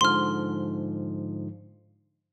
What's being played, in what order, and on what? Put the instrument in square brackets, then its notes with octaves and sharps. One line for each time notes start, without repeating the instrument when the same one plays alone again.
[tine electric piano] G#2 D3 F3 [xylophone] C6 F6